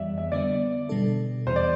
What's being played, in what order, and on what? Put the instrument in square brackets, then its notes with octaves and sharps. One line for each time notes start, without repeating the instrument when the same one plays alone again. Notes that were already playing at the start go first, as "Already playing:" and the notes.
Already playing: [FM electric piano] F2 E3 G3 [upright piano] D5 E5
[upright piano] E5
[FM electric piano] D3 G3 B3 [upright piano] D5
[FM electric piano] B2 G3 D4 A4
[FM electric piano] E2 C3 E3 [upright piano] C5
[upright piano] D5